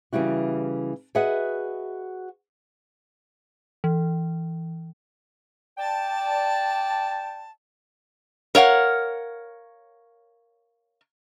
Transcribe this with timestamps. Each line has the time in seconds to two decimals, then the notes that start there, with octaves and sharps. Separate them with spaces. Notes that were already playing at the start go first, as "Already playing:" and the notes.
0.13 C#3 E3 G3 E4 F#4
1.15 F#4 G#4 B4 D#5 E5 F#5
3.84 E3
5.78 D5 G5 A5
8.55 A#4 C#5 F5 F#5